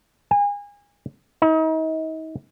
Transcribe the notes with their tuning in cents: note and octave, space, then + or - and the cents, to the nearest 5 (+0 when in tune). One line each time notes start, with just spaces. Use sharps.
G#5 -30
D#4 +40